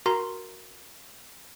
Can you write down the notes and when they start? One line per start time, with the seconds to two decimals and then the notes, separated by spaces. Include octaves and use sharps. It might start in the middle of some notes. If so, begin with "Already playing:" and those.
0.06 F#4 A#4 A#5 C6